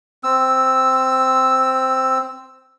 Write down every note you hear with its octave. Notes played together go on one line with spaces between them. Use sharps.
C4 E6